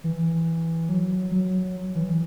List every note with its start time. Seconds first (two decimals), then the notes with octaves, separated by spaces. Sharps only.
0.04 E3
0.89 F#3
1.31 F#3
1.95 E3